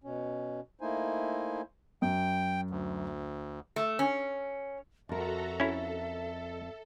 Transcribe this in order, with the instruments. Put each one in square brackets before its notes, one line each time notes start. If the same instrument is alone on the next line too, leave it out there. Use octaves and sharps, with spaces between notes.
[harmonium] B2 C#4
A3 A#3 D#4 E4 C5 G#5
[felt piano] F#2 [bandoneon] G5
[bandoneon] D2
[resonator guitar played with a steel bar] A3
C#4
[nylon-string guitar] F2 A#4 [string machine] F#4 A4 A#5 [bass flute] E5
[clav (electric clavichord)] C#4 E4 [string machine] A4